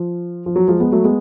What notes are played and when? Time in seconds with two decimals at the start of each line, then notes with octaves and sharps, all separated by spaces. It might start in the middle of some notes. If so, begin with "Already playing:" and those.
Already playing: F3
0.46 F3
0.56 F#3
0.68 F3 G#3
0.80 G#3 B3
0.92 F#3 A3
1.04 G#3 B3